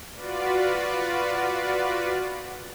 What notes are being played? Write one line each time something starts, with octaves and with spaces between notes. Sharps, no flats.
F4 F#4 B4 D5